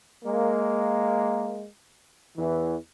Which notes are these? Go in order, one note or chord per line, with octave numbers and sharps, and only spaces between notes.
G#3 A#3
E2 E3